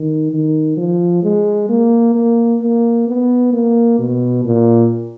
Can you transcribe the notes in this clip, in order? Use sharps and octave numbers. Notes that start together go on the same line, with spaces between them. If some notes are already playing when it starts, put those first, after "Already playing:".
Already playing: D#3
D#3
F3
G#3
A#3
A#3
A#3
B3
A#3
B2
A#2